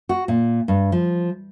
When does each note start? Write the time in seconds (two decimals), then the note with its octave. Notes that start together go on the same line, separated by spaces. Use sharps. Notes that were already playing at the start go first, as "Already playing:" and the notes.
0.09 F#4
0.28 A#2
0.68 G2
0.92 F3